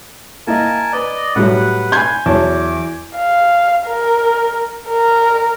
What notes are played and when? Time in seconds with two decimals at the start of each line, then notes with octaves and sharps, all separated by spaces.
0.47 A#3 E4 A#4 D#5 G#5 A5
0.93 B4 D5 D#5
1.36 A2 F#3 G3 B4 F#5
1.92 G#5 B5 C6 G6 G#6
2.26 E2 F#3 C#5 A5 D6
3.17 F5
3.87 A#4
4.89 A#4